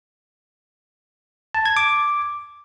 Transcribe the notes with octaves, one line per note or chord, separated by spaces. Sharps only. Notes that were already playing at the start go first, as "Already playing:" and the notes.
A5
G#6
D6